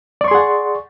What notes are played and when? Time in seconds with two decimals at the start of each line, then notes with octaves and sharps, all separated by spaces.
0.21 D5
0.24 C#6
0.28 C6
0.31 G#4
0.35 F#5